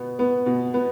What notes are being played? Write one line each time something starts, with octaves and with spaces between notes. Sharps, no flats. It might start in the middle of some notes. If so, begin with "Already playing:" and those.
Already playing: B2 B3
B3
B2
B3